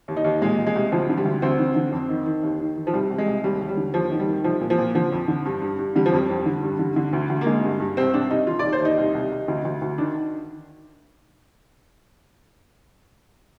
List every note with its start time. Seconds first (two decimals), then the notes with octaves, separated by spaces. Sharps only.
0.08 D#2
0.17 D#4
0.24 D#2
0.42 A#2 G#3
0.58 A#2
0.67 G#3
0.76 C2
0.92 D2 F3
1.09 D3
1.17 G3
1.25 D2
1.42 D2 C4
1.59 D3
1.76 D3
1.92 F2
2.09 D#3
2.26 D#3
2.43 D#2
2.60 D#3
2.77 D#3
2.87 F3
2.93 C2 G3
3.10 C2
3.18 G#3
3.27 C2
3.44 D#2 G3
3.61 D#2
3.69 G3
3.77 D3
3.94 D#2 F3
4.11 D#3
4.19 G3
4.28 D#3
4.44 C2 F3
4.61 A#2
4.70 F3
4.78 A#2
4.95 D3 F3
5.12 F2
5.28 D3
5.45 G2
5.62 G2
5.79 G2
5.96 D3 G3
6.06 F3
6.12 F2 G3
6.29 F2
6.46 D3
6.63 G2
6.79 D3
6.96 D3
7.13 D2
7.29 D2
7.41 A#3
7.46 D3 G#3
7.63 G2
7.80 G2
7.97 C2 C4
8.14 C2 D4
8.30 C2 D#4
8.47 D#3 F4
8.59 D5
8.64 D#2
8.73 C5
8.81 D#2 D#4
8.98 C2
9.14 C2
9.31 C2
9.48 D2
9.65 D2
9.82 D2
9.98 D#3 D4